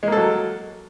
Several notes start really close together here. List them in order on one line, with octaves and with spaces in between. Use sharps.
G#3 A#3 A4 F#3